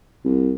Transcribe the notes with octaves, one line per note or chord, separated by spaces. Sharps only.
C2